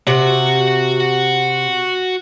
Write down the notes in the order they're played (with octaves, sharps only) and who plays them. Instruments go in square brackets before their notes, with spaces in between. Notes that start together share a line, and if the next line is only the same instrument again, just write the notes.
[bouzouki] C3 [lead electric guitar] F#4 F#5